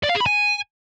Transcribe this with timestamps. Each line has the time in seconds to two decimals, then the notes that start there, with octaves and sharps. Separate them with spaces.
0.03 D5
0.09 F5
0.15 G#4
0.20 B5
0.26 G#5